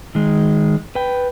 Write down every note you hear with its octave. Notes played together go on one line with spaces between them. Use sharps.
D#3 G#3
B4 G5